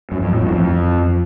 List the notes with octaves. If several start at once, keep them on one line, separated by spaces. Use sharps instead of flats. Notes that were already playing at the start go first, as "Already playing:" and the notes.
F#2
F2
A2
F2
F2